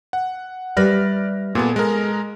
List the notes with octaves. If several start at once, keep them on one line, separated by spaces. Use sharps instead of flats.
F#5
G3 B4 D5 E5 F6 A#6
A#2 B3 G#4 A4
G#3 A#4